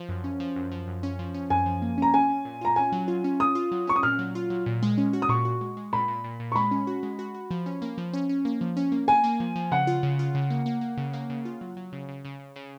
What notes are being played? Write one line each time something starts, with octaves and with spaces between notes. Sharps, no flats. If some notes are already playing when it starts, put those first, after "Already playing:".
Already playing: F3
F#2
C#4
F3
F#2
F3
F#2
C#4
F3
C#4
F#2 G#5
F3
A#3
C#4 A#5
C#4 G#5
C#4
A#2
F4 A#5
C#4 G#5
F#3
F4
C#4
F4 D#6
F4
F#3
C#4 C#6
D#6
A#2 F6
F#3
F4
F#3
A#2
G#3
C#4
F#4
D#6
A#2 C#6
F#4
G#3
G#3
A#2 B5
A#2
A#2
A#2
C#6
G#3 B5
C#4
F#4
G#3
F#4
F#4
F3
C#4
A#3
F3
C#4
C#4
A#3
F3
C#4
A#3
A#3 G#5
A#3
F3
F3
C#3 F#5
F4
C#3
F4
C#3
A#3
A#3
A#3
C#3
A#3
C#3
F4
F#3
F#3
C#3
C#3
C#3
C#3
C#3